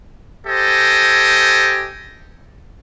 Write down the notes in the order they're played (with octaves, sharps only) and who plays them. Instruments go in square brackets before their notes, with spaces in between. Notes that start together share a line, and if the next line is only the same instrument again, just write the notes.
[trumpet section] G4 A4 C5 D#5 G#5